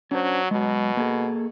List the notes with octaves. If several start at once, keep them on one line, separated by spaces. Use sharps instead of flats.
F#3 C#4 D4 C5
B2 F#3 G#3
A#3 G#4 A4